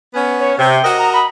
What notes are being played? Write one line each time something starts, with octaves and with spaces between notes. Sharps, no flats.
B3 C#4
C#5
C3 G5
F#4 A#4 D#5
A#5
B5